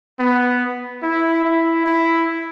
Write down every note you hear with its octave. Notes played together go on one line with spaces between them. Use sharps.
B3
E4
E4
E4